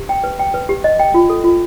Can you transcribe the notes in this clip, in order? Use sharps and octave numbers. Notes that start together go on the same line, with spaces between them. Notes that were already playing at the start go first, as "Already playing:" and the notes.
Already playing: G4
G5
B4
G5
B4
G4
D#5
G5
F4
A4
F4